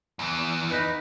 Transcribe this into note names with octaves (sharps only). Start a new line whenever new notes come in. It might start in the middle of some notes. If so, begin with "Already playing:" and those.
E2 E3
D#4 B4